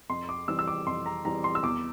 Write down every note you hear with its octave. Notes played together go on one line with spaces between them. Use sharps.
F2 C6
D6
E3 G3 C4 E6
E6
D6
F2 C6
A#5
E3 G3 C4 A#5
C6
E6
E2 D6